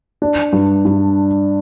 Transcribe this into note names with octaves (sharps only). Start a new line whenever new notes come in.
D4
G2
G2